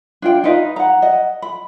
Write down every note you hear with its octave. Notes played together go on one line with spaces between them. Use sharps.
D4 F4 G5
D#4 F4 B4 D#5
F#5 A#5
D#5 F#5
B5